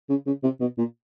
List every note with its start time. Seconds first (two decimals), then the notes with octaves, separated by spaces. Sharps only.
0.09 C#3
0.26 C#3
0.43 C3
0.60 B2
0.78 A#2